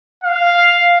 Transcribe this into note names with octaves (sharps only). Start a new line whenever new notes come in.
F5